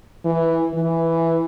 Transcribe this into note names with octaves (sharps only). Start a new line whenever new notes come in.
E3
E3